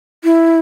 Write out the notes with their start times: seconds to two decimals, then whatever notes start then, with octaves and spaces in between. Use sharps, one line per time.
0.24 E4